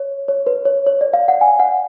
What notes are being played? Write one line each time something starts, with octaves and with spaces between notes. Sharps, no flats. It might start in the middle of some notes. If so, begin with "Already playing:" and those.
Already playing: C#5
C#5
B4
C#5
C#5
D5
F5
F#5
G#5
F#5